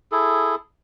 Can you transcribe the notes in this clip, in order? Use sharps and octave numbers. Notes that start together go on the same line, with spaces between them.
E4 G#4 A4